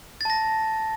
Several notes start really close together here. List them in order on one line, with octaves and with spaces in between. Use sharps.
A6 A5 A#6